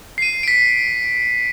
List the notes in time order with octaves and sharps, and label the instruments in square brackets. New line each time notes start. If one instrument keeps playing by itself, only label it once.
[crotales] C7 D#7
B6 D7